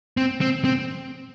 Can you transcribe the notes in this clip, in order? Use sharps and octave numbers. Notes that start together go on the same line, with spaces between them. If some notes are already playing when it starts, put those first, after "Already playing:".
C4
C4
C4